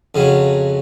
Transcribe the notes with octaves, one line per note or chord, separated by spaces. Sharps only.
F2 C#3 F#3